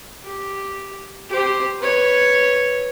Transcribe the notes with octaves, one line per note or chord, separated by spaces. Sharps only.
G4
G4 C5
B4 C#5